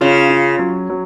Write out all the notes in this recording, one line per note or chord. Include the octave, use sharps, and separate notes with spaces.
C#3 F4
F4
F#3
F#3